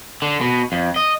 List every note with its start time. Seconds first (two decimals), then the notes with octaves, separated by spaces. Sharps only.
0.22 D3
0.41 B2
0.72 F2
0.96 D#5